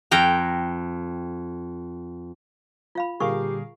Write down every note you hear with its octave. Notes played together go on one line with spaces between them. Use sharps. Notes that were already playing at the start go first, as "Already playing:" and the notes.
F2 G5 A#5
F4 F5 B5
A#2 D3 G3 G4 G#4 A#4 F5 C#6